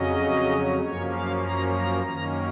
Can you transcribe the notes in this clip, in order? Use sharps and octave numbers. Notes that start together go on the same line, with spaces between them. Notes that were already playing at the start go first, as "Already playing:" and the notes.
Already playing: F2 C#3 F#3 C#4 D#5
F#2 F3 A#3 C#4 C#5
F5
A#5
A#5
F#2 D#3 A#3 C#4 A#5